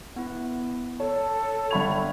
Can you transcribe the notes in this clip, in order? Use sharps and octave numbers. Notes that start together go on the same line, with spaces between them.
B3 E4
A4 C#5 A5
G1 D5 E5 B5 C#6 G#6 F7